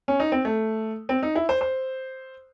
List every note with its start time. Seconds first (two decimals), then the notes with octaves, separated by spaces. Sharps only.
0.08 C#4
0.20 D#4
0.32 C4
0.45 A3
1.09 C4
1.23 D#4
1.35 E4
1.49 C5
1.61 C5